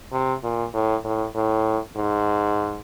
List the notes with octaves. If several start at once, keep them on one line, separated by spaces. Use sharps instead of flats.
C3
A#2
A2
A2
A2
G#2